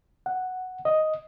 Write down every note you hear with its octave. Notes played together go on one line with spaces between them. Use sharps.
F#5
D#5